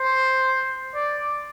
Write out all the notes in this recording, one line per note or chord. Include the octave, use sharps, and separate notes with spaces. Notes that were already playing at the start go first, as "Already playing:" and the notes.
Already playing: C5
D5